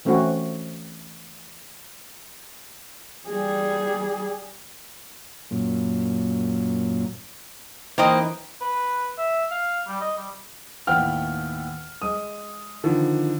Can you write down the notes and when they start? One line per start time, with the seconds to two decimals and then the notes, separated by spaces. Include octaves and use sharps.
0.05 E3 A3 C4 C#4 F#4
3.29 G3 G#4
5.51 F#2 A#2
7.98 E3 A#3 C4 D#4 B4 D#5
8.61 B4
9.18 E5
9.51 F5
9.87 G3
10.01 D#5
10.17 G3
10.87 D#2 A2 B3 F#5 G5 F6
12.02 G#3 D#6
12.84 D3 D#3 F3